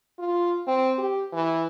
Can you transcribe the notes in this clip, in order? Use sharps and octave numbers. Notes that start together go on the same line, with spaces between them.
F4
C4
G4
E3